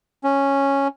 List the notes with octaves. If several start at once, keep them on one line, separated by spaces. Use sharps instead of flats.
C#4